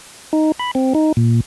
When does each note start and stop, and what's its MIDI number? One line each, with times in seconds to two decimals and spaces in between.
0.33 0.52 63
0.60 0.71 83
0.75 0.93 60
0.95 1.12 63
1.17 1.41 46